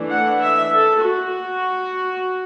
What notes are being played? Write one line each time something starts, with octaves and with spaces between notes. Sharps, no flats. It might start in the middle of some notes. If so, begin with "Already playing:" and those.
Already playing: E3 A3 D4
F#5
E5
A4
F#4